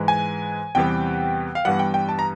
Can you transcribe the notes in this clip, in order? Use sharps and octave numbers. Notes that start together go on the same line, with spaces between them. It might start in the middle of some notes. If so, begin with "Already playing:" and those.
Already playing: G#2 E3 G#3
G#5
E2 C3 E3 G3 B3 G5
F5
G2 E3 G3 B3 F#5
G5
G5
A5
A#5